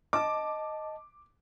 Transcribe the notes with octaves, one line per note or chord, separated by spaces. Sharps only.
D#5 A5 D6